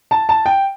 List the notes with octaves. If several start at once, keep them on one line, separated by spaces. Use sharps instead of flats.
A5
A5
G5